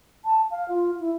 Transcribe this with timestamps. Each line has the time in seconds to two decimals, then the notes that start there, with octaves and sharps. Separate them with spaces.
0.25 A5
0.51 F5
0.69 F4
1.00 E4